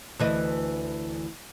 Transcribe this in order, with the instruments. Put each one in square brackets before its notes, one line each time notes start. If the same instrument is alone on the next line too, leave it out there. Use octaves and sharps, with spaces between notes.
[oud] D2 E3 D#5